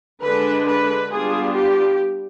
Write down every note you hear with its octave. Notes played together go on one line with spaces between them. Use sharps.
D3 G#3 D4 B4
B4
G3 B3 D4 F4 G#4
G4